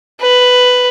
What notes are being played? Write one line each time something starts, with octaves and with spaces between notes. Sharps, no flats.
B4